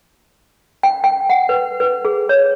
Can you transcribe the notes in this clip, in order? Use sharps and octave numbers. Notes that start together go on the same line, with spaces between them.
G5
G5
F#5
B4
B4
G#4
C#5